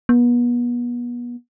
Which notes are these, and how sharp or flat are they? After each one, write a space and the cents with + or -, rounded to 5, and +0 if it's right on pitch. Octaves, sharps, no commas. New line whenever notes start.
B3 -35